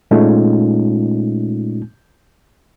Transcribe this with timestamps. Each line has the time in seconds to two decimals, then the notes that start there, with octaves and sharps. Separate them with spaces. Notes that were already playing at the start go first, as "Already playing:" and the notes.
0.11 A#2 G#3 A3 C#4 D#4 F4